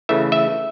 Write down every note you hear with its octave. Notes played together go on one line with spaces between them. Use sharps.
C#3 E3 A3 E5
E5